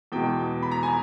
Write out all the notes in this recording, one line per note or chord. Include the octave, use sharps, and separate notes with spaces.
E2 B2 G#3 G5
B5
A#5
G#5